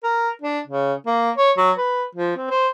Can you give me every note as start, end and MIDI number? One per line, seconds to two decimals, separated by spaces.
0.04 0.30 70
0.42 0.60 62
0.67 0.93 49
1.06 1.31 58
1.37 1.51 73
1.57 1.71 54
1.78 2.05 71
2.15 2.35 53
2.36 2.46 60
2.50 2.68 72